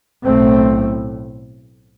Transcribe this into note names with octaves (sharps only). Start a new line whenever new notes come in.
B1 A2 A3 C4